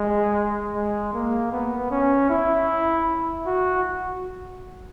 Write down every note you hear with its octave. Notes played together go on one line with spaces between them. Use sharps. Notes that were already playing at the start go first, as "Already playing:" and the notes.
Already playing: G#3
G#3
A#3
B3
C#4
E4
F#4